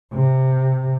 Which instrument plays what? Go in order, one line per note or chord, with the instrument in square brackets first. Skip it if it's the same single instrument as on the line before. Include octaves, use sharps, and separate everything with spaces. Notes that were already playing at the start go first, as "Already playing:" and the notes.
[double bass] C3